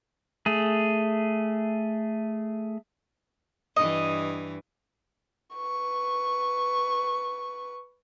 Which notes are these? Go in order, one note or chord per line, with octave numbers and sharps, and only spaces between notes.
A3 G#4
G2 E3 D#5
B4 C#6